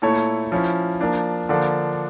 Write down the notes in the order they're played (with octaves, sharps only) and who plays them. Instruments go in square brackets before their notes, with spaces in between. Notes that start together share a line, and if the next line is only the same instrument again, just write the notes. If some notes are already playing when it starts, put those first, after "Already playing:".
[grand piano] A#2 A3 E4 A4 C#5
F3 C#4 E4
F3 A#3 D4
D3 F3 A#3 D4 A4